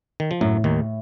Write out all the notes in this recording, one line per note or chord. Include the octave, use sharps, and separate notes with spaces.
D#3
F3
F#2 A2 F#3
D#2 D#3